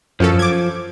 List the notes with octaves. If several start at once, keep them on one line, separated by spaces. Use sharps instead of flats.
F#2 F3 C#4 A4
D6 G#6